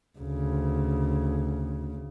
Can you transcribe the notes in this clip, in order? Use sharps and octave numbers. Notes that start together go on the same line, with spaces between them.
D2 C#3